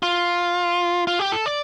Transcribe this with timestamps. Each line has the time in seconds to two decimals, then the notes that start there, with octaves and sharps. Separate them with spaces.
0.03 F4
1.07 F4
1.19 G4
1.32 A4
1.46 D5